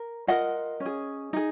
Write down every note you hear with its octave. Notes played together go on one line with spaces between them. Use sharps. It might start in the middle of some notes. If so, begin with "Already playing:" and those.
Already playing: A#4
F4 A#4 D#5 F#5
C#4
G#4
D#4 G#4